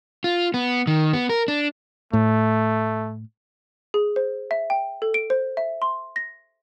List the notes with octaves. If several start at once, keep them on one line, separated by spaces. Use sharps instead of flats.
F4
B3
D#3
B3
A#4
D4
A2 A3
G#4
C5
E5
G5
A4
D7
C5
E5
C6
A#6